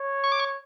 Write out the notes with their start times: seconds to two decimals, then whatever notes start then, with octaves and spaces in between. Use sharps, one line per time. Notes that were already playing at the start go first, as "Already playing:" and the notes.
Already playing: C#5
0.24 C#6
0.32 D6
0.39 C#6